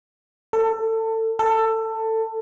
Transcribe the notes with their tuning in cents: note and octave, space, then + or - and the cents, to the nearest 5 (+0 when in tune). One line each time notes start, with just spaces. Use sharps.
A4 +25
A4 +20